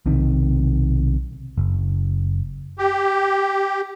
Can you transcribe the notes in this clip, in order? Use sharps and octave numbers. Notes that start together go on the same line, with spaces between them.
B1 C3 D#3
F#1
G4